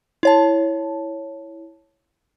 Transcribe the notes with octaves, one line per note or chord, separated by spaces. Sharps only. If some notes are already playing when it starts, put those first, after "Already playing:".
E4 C#5 A5